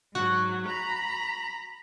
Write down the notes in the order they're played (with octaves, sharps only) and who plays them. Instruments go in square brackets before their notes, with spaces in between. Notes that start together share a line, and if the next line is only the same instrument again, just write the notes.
[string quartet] G#2 F#3 [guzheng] F#4
[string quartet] A#5 B5